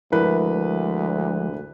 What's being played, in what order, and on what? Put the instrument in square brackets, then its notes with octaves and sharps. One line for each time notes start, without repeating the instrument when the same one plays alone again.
[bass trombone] D2 [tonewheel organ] F3 G#3 [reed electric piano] E4 A#4 [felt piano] B4